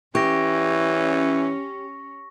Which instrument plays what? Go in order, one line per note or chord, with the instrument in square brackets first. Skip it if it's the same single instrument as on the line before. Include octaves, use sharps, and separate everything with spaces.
[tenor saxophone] E3 [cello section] C#4 [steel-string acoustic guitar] G4 [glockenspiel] C#6 A#6